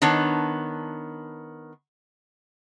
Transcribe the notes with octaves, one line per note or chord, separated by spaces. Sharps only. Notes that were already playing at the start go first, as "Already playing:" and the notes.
D#3 B3 D4 C#5 A5